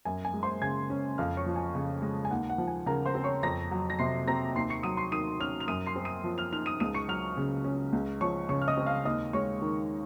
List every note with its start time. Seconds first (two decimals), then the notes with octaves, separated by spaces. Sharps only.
0.05 F#2 G#5
0.25 G#5
0.34 G#3
0.43 C5 C6
0.62 C#3 G#5 G#6
0.90 C#4
1.18 F2 F5 F6
1.37 C#5 C#6
1.46 F3
1.56 G#5
1.75 C#3
2.02 G#3
2.25 G#5
2.30 D#2 F#5
2.49 F#5
2.58 F3
2.68 G#5
2.86 C#3 A#4 A#5
3.06 C5 C6
3.15 C4
3.24 C#5 C#6
3.43 F2 A#5 A#6
3.71 F#3
3.90 A#6
3.99 C3 C6 C7
4.28 C4 A#5 A#6
4.56 D#2 C6 C7
4.70 C#6 C#7
4.83 F#3 D#6 D#7
4.97 C6 C7
5.12 D#3 D#6 D#7
5.40 C#4 F6 F7
5.60 F7
5.68 F#2 D#6 D#7
5.86 C6 C7
5.96 C4
6.05 D#6 D#7
6.24 F3
6.38 F6 F7
6.52 D#4 F6 F7
6.66 D#6 D#7
6.80 C#2 D#6 D#7
6.94 C#6 C#7
7.08 F#3 F6 F7
7.37 C#3
7.64 C#4
7.93 C#2
8.21 F3 C#5 C#6
8.49 C#3 C#5 C#6
8.62 F6
8.68 D#5 D#6
8.77 C4
8.86 F5 F6
9.05 D#2 D#5 D#6
9.33 G#3 C#5 C#6
9.62 D#3